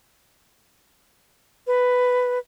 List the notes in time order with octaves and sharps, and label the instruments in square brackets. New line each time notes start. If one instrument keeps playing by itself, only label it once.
[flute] B4